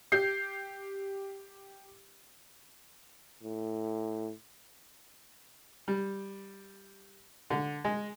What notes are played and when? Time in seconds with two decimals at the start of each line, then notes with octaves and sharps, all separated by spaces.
0.12 G4 G6 C7
3.43 A2
5.88 G3
7.50 D3
7.85 G#3